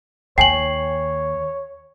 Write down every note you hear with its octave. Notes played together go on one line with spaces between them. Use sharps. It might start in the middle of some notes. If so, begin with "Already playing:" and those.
D#2 C#5 G5 G#5 C7 F#7